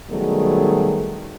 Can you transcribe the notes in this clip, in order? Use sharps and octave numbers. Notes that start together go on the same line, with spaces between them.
B2 D#3 F#3 G3 A3 G#4